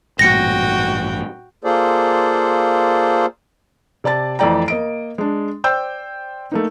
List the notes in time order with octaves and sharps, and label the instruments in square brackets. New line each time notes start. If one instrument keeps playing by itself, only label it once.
[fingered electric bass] A1 G2 A#2 [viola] F#4 G5 [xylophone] A#6 C#7
[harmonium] A#3 F4 G#4 A4 C5 D5
[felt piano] C3 D5 A5 A6
F2 E3 A3 D5 G5 A#5
A#3 D#5 D7
G#3 D4
C5 D5 G5 E6 G6
A3 A#3 D#4